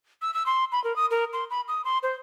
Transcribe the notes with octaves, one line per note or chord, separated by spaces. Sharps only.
E6
E6
C6
B5
A#4
D#6
A#4
C6
B5
D#6
C6
C5